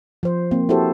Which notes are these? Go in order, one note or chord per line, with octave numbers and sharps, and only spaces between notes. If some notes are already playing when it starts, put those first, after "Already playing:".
F3 C5
A#3 C4
E4 F#4 G4 A4 C5